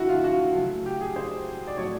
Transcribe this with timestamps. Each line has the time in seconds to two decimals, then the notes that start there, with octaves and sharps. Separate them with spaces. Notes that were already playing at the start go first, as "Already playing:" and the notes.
Already playing: D3 F3 A3 E4 F#4
0.09 F4
0.24 F#4
0.55 C#3 F#3 A3
0.86 G4
1.01 G#4
1.16 C5
1.67 D5
1.77 A2 F#3 A3 C#5